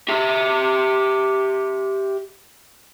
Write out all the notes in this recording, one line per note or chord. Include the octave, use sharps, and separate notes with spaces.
G4 E5